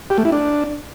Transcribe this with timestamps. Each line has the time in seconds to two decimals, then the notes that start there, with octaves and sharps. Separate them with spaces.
0.10 G4
0.18 A3
0.25 E4
0.32 D4